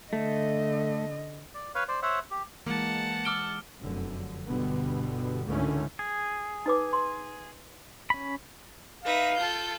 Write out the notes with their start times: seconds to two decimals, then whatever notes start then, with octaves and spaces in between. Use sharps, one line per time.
0.13 D3 A3 D#5
1.54 D5
1.75 B4 C#5 F5
1.88 C5 D5
2.02 C5 C#5 E5 F#5
2.31 G4
2.66 E3 G#3 A#3 F#5 A5
3.25 D6 E6 F6 D7 G7
3.81 F1 F#2 D3
4.48 G1 B2 D3 G3 B3
5.46 C#2 G#2 D3 D#3 A3 C#4
5.99 G#4
6.66 D#4 B4 D6
6.93 C6
8.10 C#4 B5
9.05 D#4 B4 E5 F5
9.37 F4 A4 G6